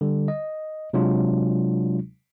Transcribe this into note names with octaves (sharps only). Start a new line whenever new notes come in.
D3 G3
D#5
C3 F#3 G#3 D4 F4